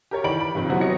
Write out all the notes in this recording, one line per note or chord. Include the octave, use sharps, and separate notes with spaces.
G4 A#4 C#5
D#3 E3 D5 B5 D7 F#7
B5
G2 C3 D#3 F3
F#3 B3 C4 E4 F#4 G4
C#5 D#5 A#6 C#7